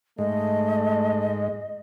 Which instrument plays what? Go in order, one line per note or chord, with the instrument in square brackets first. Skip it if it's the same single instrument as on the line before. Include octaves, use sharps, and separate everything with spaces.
[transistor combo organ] G#2 G#3 [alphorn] A3 [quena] D#5